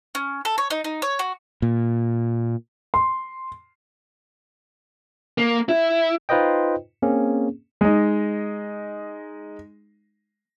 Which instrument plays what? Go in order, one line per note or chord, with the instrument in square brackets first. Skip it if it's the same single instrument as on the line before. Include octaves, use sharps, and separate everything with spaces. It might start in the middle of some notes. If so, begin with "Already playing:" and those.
[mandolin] C#4
A4
C#5
D#4
D#4
C#5
F#4
[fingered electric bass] A#2
[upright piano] C6
[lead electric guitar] A#3
E4
[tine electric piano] D#4 F4 B4 C5 D#5 G5
A#3 C4 C#4 G#4
[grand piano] G#3 D#4